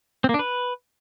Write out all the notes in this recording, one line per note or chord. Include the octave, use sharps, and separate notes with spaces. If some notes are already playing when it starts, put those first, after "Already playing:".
C4
A#3
D4
B4